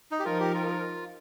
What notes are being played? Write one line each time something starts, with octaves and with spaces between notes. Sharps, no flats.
D#4
G4
F3 D#4 F4 A#4
G4
F4